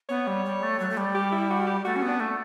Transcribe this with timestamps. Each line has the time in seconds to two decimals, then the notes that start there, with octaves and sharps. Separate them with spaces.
0.09 B3 C#5
0.27 G3
0.45 G3
0.62 A3
0.80 F#3
0.89 A3
0.97 G3
1.15 G4
1.32 E4
1.50 F#4
1.67 G4
1.85 A3 F#4
1.96 C#4
2.02 B3
2.08 D4
2.20 A3